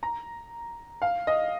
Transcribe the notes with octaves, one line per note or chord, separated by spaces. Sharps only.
A#5
F5
D#5